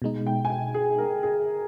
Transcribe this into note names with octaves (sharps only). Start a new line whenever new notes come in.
B2 G#3 D#4
G5
G#5
G5
G#4
A#4
G#4